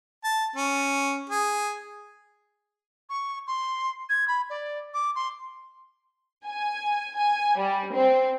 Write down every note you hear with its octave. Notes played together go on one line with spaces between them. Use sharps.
A5
C#4
G#4
C#6
C6
G#6
B5
D5
D6
C6
G#5
G#5
G3
C4